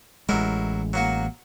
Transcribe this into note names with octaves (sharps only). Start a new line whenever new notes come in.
A1 F#3 G#3 E4 A#4
F#3 A#3 F#4